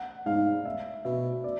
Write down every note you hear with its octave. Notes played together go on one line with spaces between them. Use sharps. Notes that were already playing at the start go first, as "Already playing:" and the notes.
Already playing: F#5
G#2 F5
E5
B2 E5
D5